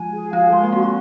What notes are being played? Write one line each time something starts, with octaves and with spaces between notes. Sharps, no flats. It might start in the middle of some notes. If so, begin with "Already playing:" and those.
Already playing: F3 G#3 F4 G#5
G#4
F3 F4 F5
G#3 C6
A#3
C4 F#4